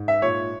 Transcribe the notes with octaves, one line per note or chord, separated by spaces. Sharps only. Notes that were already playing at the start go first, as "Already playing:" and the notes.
Already playing: G#2
E5
A#2 C#5